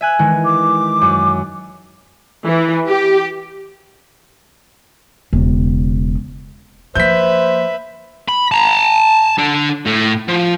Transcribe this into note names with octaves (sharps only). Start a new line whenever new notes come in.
E5 G#5 F#6
D#3 E3 G#3
D6
F#2
E3
G4
E1 C#3
F3 A#3 B4 C5 E5 G6 B6
B5
A5 A#5
D4 A4
A2
F3